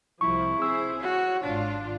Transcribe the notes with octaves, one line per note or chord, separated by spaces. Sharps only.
C2 F3 E4 C#6
C4 G#4 C5 E6
F#4 C#5
G#1 D4 F4